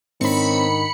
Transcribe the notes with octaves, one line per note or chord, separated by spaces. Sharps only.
G#2 D#3 C4 D4 C#5 B5 C#7